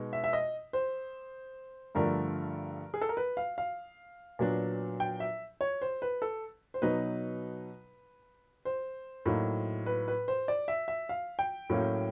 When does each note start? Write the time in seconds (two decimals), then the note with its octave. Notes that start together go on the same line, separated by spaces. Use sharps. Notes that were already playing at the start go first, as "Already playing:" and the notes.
Already playing: B2 G#3 B3 D#4
0.13 E5
0.24 E5
0.33 D#5
0.73 C5
1.95 G2 D3 F3 A3 A#4
2.94 G#4
3.01 A4
3.09 A#4
3.17 B4
3.37 F5
3.58 F5
4.39 A#2 F#3 B3 D4
5.00 G5
5.20 E5
5.61 C#5
5.82 C5
6.02 B4
6.22 A4
6.74 C5
6.82 B2 F#3 B3 D#4 B4
8.65 C5
9.26 A2 F#3 A#3 D#4
9.86 B4
10.08 B4
10.28 C5
10.48 D5
10.68 E5
10.88 E5
11.09 F5
11.39 G5
11.70 A2 F#3 A#3 C#4